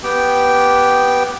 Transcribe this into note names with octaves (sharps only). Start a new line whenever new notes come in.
B3 G4 G5